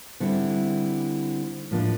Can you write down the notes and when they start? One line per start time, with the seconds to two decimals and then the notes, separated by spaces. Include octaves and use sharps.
0.20 D3 G3 C4 E4
1.71 A2 F3 A#3 D4